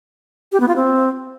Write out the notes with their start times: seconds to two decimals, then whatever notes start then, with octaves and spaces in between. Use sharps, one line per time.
0.52 G4
0.60 B3
0.68 F4
0.76 C4